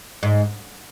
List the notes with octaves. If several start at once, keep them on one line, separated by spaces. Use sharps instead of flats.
G#2